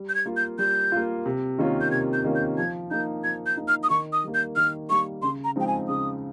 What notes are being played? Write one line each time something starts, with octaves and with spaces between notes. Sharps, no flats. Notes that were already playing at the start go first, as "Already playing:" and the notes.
Already playing: G3
G6
G#6
A#3 F4
G6
G3 G6
A#3 F4
C3
D#3 A#3 C#4 F4
G6
C3 G#6
G6
D#3 A#3 C#4 F4
G6
F3 G#6
A#3 D#4 G6
F3 G#6
G6
A#3 D#4
F6
D#6
D#3 C#6
D#6
G3 A#3
G6
D#3 F6
G3 A#3 C#6
C#3 C6
A#5
F3 G#3 C4 D#4 G5
G#5
C#3 D#6